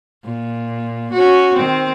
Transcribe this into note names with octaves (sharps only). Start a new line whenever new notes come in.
A#2
C#4 F#4
D#3 C4